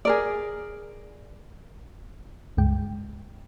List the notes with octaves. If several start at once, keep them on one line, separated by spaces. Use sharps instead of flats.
G#4 A#4 D5
C#2 G2 G#3 G5